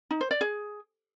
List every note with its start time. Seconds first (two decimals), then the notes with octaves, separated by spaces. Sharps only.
0.11 D#4
0.21 C5
0.31 D5
0.41 G#4